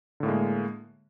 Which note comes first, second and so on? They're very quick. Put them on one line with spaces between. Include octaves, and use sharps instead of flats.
D3 A2 A#3 G#3